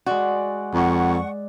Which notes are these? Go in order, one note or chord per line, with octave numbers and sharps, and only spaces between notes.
G#3 F#4 D5
F2 F#5 C#6